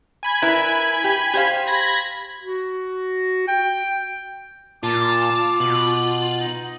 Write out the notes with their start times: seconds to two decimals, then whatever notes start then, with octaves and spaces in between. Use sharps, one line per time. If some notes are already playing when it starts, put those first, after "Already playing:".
0.23 G#5 B5 G#6
0.42 E4 A#4 B4
1.04 G4
1.34 G4 C5 F5
1.67 B5 G#6 A#6
2.41 F#4
3.48 G5
4.83 A#2 F4 A5 D6
5.60 B2 F#7
6.40 D#4